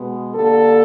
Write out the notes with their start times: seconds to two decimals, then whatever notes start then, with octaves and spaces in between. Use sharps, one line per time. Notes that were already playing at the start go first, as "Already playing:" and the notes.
Already playing: B2 G#3 B3
0.34 D3 G3 A#3 A4